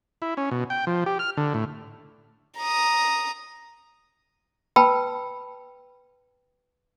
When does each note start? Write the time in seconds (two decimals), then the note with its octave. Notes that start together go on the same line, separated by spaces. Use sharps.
0.22 E4
0.37 C#4
0.51 B2
0.70 G5
0.87 F3
1.06 G4
1.19 F6
1.37 D3
1.54 A2
2.59 A#5 D#6
4.76 B4 G5 A5 B5 E6